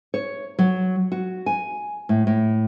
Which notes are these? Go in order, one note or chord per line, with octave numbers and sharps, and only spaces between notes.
C#5
F#3
F#4
G#5
A2
A2